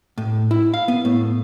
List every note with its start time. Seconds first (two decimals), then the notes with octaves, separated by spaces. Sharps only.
0.18 A2
0.51 E4
0.74 F5
0.88 B3
1.05 A2